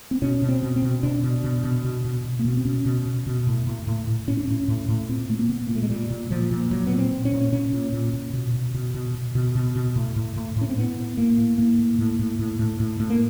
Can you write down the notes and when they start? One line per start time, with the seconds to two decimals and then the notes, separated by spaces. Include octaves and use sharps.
0.11 C4
0.22 B2 C#4
0.42 B2
0.49 C4
0.63 B2
0.76 C4
0.82 B2
1.03 B2 D4
1.23 B2
1.44 B2
1.64 B2
1.84 B2
2.05 B2
2.25 B2
2.39 A#3
2.45 B2 B3
2.57 C4
2.65 B2 C#4
2.86 B2
3.06 B2
3.27 B2
3.47 A2
3.67 A2
3.87 A2
4.07 A2
4.27 A2 C#4
4.37 D4
4.46 A2 C#4
4.68 A2
4.89 A2
5.09 A#2 C4
5.29 A#2 A3
5.39 A#3
5.49 A#2 B3
5.67 A#2 A#3
5.75 A3
5.82 G#3
5.89 A#2 G3
6.10 A#2
6.30 A#2 F3
6.51 A#2
6.71 A#2 F#3
6.87 A#2 B3
6.98 C4
7.12 A#2
7.25 C#4
7.32 A#2
7.52 A#2 C#4
7.73 A#2
7.92 A#2
8.13 A#2
8.33 B2
8.54 B2
8.74 B2
8.94 B2
9.15 B2
9.35 B2
9.55 B2
9.76 B2
9.96 A2
10.16 A2
10.36 A2
10.56 A2 C#4
10.69 C4
10.77 A2 B3
10.97 A2
11.17 A2 A#3
11.38 A2
11.58 A2 A#3
11.78 A2
11.99 A2
12.19 A2
12.39 A2
12.59 A2
12.80 A2
13.00 A2
13.10 A#3